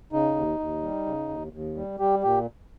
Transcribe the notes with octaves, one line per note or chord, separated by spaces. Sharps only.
C#3 D#4
D#2
D#2
G3
C#3
D#2
D#2
G3
G3 G4
A#2 G4